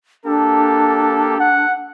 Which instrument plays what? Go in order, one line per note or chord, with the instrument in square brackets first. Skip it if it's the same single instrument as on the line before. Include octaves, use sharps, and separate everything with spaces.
[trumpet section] A#3 G4 A4 [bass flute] D4
[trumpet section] F#5